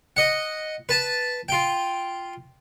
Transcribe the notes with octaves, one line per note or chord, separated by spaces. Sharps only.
D#5 F#5
B4 A5
F4 G5